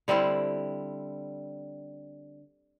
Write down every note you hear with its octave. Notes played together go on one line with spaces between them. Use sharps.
D3 G3 C4 E4